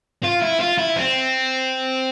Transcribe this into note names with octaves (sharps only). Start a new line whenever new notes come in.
F4
E4
F4
E4
C4